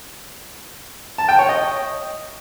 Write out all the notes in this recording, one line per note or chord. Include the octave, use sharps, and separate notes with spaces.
A5
G5
C#5
D#5